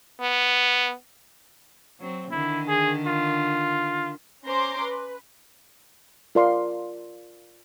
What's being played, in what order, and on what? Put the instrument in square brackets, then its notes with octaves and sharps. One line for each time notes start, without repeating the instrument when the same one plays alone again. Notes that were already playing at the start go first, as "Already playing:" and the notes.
[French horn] B3
[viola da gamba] F#3 C4
[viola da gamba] D3 D#3 [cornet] E4
[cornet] G#4
F4
[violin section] C#4 C5 A#5 C6 D6
B4
[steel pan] F4 A#4 D5 F5 C6